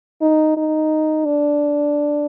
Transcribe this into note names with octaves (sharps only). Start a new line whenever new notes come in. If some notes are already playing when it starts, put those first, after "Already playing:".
D#4
D#4
D4